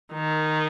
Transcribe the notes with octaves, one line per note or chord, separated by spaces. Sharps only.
D#3